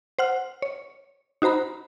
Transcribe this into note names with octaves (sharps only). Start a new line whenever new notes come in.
C5 F#5 F6
C#5
D#4 F#4 C5 A#5 B5